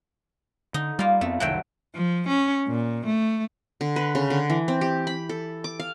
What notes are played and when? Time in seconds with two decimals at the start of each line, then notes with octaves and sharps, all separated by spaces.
0.74 D3 D#4
0.99 G3 A#3 F4
1.21 F2 A3 B3 C4
1.40 F#1 C2 D#3 F#3 A3 G5
1.95 F3
2.28 C#4
2.68 A#2
3.06 A3
3.81 D3
3.96 B4
4.15 C#3
4.30 D3
4.50 E3
4.68 C4
4.81 G4
5.07 B5
5.29 A4
5.64 D6
5.80 F5